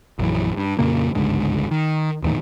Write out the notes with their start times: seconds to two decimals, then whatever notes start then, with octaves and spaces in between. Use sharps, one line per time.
0.19 A#1 F#2 E3
0.57 G2
0.79 F2 A#2 C#3 A#3
1.15 G1 C#2 G#2 D3
1.71 D#3
2.23 D#1 E2 A2 D#3